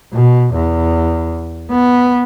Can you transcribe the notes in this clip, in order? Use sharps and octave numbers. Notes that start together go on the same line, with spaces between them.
B2
E2
B3